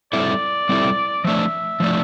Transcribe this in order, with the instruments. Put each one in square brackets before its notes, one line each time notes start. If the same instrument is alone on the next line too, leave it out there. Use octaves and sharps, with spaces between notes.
[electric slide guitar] G3 C4 E4 A4 E5 [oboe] D5
[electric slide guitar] G3 C4 E4 A4 E5
[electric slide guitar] F3 A3 D4 [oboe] E5
[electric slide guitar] F3 A3 D4